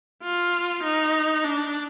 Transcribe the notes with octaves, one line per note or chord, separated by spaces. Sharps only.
F4
D#4
D4